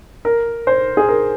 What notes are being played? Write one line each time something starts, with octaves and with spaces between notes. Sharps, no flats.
A#4
C5
G#4
A#4